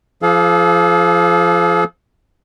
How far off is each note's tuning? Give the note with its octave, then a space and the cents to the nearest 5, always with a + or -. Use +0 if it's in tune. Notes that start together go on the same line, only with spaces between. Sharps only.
F3 -15 A4 -45 F5 +15